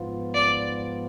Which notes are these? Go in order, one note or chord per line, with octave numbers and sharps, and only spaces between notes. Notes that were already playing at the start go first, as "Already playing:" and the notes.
Already playing: G#2 F3 B3 F4
D5